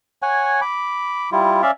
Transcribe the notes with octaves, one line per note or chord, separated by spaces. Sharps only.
C#5 F#5 G#5
B5 D6
G3 E4 F4
C#4 D5 E5 F5